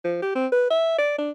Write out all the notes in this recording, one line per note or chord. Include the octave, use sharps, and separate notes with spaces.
F3
G4
C4
B4
E5
D5
D4